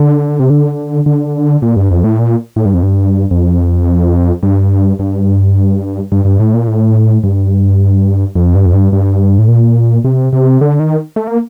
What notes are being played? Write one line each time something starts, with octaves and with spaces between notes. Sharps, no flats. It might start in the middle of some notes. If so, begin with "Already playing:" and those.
Already playing: D3
C3
D3
D3
A#2
G2
F2
A2
A#2
A2
G2
F2
G2
F2
G2
G2
G2
G2
A2
A#2
A2
G2
F2
G2
F2
G2
G2
A2
A#2
C3
C3
D3
D#3
A3
A#3